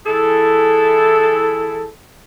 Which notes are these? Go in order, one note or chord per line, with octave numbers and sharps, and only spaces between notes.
E3 E4 G#4 A4